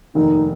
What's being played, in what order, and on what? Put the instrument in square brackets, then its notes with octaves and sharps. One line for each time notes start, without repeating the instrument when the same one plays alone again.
[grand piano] F1 D#2 D#3 [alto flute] D#4